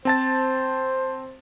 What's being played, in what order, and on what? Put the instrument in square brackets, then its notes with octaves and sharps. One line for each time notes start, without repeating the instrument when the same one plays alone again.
[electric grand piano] C4 A5 A6 [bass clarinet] C5